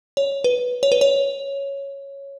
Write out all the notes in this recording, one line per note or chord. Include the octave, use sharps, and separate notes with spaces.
C#5
B4
C#5
B4
C#5